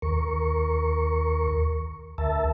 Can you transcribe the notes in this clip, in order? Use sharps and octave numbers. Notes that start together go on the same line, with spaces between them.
D#2 A#4 C#6
D2 A#4 E5 A5